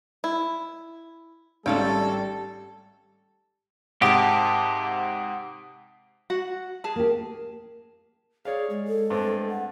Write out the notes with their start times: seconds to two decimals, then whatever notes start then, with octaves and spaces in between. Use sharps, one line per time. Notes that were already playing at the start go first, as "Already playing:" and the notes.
0.24 E4
1.66 G#1 G3 A3 C#4 A4 F5 G5
4.02 G#2 C3 A#3 G4 F#5 A5 D#6
6.30 F#4 F#5
6.84 G#4 A5
6.96 A#3 G4
8.45 G#4 C#5 D5 F5
8.70 G#3
8.88 A4
9.10 G2 A3 C4
9.50 F#5